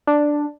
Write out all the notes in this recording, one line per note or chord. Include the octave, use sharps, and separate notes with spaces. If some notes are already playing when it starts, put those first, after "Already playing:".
D4